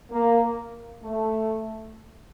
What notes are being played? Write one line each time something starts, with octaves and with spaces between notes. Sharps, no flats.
A#3
A3